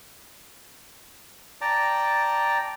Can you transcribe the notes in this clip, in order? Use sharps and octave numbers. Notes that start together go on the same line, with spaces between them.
D5 G5 A5 A#5